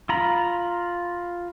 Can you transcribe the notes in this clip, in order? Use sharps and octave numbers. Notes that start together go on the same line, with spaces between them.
F4 A#5 B5